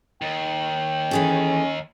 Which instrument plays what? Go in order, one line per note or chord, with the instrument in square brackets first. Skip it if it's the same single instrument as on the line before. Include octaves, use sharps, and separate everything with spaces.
[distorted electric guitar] D#2 [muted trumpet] G5
[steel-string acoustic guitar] E3 G#4 A4 [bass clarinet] C#4